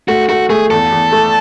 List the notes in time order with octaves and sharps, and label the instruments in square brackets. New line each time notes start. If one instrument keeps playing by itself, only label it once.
[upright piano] A3 [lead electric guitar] F#4
[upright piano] A3 [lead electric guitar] F#4
[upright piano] A3 [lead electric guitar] G#4
[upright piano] E2 [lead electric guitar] A4
[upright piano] E2
A3